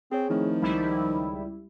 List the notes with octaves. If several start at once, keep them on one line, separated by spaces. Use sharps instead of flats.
C4 G#4 C#5
D#3 F3 A3 C4 E4
C#2 G3 E4 B5